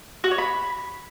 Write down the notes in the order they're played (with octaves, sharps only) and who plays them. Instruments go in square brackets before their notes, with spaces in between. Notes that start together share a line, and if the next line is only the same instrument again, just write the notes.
[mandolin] F#4
C#5
B5